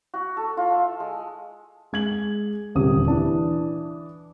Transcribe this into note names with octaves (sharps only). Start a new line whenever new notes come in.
F#4
A4
F4
E5
G#3
G#3 G#6 F#7
D#1 C2 D3 G4 D#6
E3 D4 A5